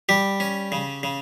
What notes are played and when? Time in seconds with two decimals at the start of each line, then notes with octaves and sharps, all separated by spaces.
0.09 G3 G4
0.40 C#4
0.72 C#3
1.03 C#3